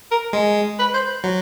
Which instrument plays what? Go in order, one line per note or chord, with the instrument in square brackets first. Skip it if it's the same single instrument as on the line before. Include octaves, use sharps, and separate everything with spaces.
[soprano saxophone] A#4
[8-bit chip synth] G#3
[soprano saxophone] B4
C5
[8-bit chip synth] F#3